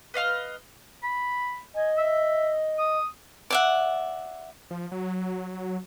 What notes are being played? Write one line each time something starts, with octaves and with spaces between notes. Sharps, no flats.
B4 D#5 F5 F6
B5
D#5 G#5
E5
D#6
D5 E5 F#5
F3
F#3